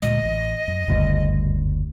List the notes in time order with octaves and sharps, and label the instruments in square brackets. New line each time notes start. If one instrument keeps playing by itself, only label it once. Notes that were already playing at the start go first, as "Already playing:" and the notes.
[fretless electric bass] D2 A#2 G#3 [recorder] D#5
[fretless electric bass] A1
F#2
[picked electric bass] F#1 D2 [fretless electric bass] G2 C#3